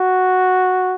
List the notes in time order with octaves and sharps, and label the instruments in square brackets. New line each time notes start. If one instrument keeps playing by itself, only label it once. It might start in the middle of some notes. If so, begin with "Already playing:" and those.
Already playing: [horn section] F#4